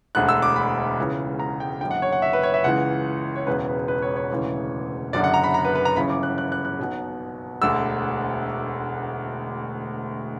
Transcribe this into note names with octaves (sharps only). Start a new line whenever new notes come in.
E1 D2 D3 F#6
E6
D6
B5
C#2 C#3 E3
A#5
G5
F#1 F#2 D3 G5
F#5
C#5
F#5
E5
B4
C#5
E5
C#2 C#3 E3 F#5
C#5
E1 E2 C#3 B4
B4
B4
C#5
C#5
E1 D2 C#3 E3
F#1 F#2 D3 D5
F#5
A#5
B5
A#5
B4
B4
A#5
G1 F#2 C#3 E3 B5
D6
F#6
F#6
F#6
F#6
B1 B2
E1 D2 D3 E6